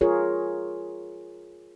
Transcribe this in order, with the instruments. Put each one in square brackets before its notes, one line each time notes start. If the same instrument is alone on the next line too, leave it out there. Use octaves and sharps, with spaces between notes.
[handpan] F4 G#4 A#4 C#5